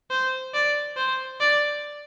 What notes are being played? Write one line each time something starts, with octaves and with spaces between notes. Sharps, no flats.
C5
D5
C5
D5